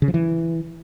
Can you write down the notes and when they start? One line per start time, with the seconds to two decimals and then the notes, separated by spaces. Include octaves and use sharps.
0.02 C#3
0.08 F3
0.14 E3